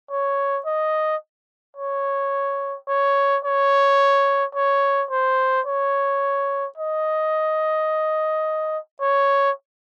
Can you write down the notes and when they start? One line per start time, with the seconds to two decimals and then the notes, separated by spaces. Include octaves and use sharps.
0.11 C#5
0.66 D#5
1.76 C#5
2.88 C#5
3.44 C#5
4.55 C#5
5.11 C5
5.66 C#5
6.78 D#5
9.01 C#5